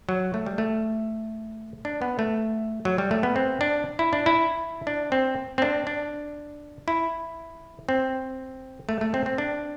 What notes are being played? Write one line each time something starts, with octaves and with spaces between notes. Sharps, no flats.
F#3
A3
G3
A3
D4
B3
A3
F#3
G3
A3
B3
C4
D4
E4
D4
E4
D4
C4
C4
D4
D4
E4
C4
A3
A3
C4
C4
D4